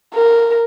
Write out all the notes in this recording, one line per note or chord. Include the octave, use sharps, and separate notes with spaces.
A#4